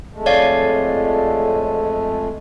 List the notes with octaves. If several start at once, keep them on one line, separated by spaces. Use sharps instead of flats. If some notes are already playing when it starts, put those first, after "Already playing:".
F2 G#3 A3
C#5 D5 F5